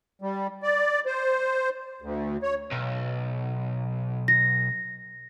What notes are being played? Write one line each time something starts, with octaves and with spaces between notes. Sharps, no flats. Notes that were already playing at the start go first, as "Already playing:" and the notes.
G3
D5
C5
D2
C#5
B1
A#6